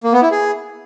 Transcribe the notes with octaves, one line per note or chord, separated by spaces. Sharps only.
A#3
B3
E4
G#4